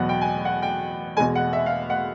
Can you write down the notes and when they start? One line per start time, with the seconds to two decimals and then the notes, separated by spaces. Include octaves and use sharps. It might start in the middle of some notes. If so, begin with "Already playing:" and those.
Already playing: E2 B2 F#3 B3 F#5
0.09 G5
0.21 G#5
0.45 F#5
0.62 G5
1.17 E2 B2 G#3 G#5
1.35 F#5
1.53 E5
1.66 F5
1.90 F#5